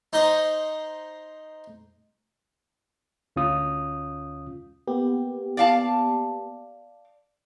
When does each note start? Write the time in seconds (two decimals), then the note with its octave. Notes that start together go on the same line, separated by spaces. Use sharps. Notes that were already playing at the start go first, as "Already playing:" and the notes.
0.13 D#4 C5 D#5 D#6
3.36 D2 C#4 F4 D#6
4.87 A#3 B3 G4
5.57 D5 F5 A5